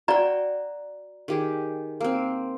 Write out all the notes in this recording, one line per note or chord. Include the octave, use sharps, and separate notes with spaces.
F#4 D5 G5 A#5
D#3 G4 G#4
A#3 C4